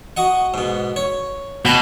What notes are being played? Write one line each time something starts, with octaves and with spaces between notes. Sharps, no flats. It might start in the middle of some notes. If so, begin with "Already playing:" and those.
F#4 D#5 F#5
G#2 B2
C#5
B2 G5 G#5 B5